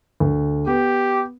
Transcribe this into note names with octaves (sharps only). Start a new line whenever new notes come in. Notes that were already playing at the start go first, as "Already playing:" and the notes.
D2
B3 G4